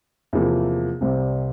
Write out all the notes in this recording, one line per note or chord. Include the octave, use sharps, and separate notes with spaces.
E2 C3 F3 A#3 E4
C2 C3 G3 C4